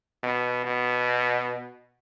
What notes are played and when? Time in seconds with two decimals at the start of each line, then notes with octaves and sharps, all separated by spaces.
0.23 B2
0.66 B2